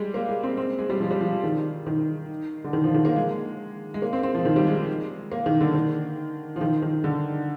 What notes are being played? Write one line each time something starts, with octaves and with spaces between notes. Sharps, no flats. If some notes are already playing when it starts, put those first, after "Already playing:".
Already playing: G3 G#3
A#3
G#3
C4
C4
G#3
G3
F3
G3
F3
D#3
D#3
D3
D#3
F3
D#3
A#3
G#3
G#3
A#3
C4
C4
F3
D#3
G3
G#3
G#3
A#3
D#3
D3
D#3
F3
D#3
D#3
D3